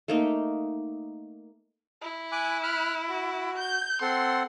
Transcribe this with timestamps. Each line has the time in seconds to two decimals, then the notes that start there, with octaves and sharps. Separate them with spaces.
0.08 A3 A#3 D#4
2.01 E4
2.32 G#5 D6 F#6
2.63 B5 F6 F#6
3.09 F#4
3.58 G6
4.01 C4 A4 F#5 C6